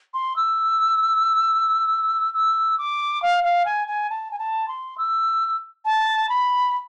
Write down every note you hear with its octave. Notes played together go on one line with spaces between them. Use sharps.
C6
E6
E6
D6
F5
F5
G#5
G#5
A5
G#5
A5
C6
E6
A5
B5